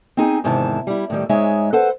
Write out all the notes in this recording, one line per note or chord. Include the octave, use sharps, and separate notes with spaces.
C4 D#4 G#4
E2 G#2 C3 D#3 E4 A5
G3 E4
A2 D#3 G3
G#2 G#3 D#4 C#5 E5
A4 B4 C5 F#5